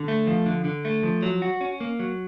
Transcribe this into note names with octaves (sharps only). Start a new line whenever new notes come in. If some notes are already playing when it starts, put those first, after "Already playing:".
Already playing: D3
A3
F3
D3
D3
A3
F3
F#3
F#4
C#4
A#3
F#3